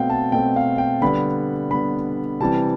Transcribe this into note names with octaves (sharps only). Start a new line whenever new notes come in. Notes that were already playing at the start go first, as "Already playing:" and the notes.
Already playing: B2 A3 C4 F5 G5
A5
B2 A3 C4 G5
F5
G5
D3 G3 B3 B5
D3 G3 B3 B5
C3 E3 G3 C4 A5